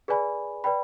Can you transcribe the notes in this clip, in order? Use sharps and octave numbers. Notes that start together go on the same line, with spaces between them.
G#4 B4 D5 G#5 B5
B4 D5 G5 B5